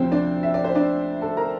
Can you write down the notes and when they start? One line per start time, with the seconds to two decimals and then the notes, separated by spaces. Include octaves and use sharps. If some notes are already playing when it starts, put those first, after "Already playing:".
Already playing: D2 C3 F3 C4 C5
0.12 D4 D5
0.43 E5
0.54 D5
0.64 C5
0.75 D4 D5
1.21 A4 A5
1.37 A#4 A#5